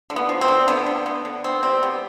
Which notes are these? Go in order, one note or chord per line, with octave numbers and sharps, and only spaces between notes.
D3
B3
F3
C4
D3
D3 B3
D3
B3
D3
B3 C4
G3 C4
G3 B3